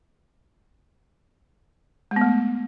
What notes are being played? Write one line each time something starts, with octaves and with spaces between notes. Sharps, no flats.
G#3
B3
A3